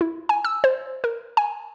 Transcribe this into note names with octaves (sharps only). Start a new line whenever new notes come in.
E4
G#5
E6
C5
A#4
G#5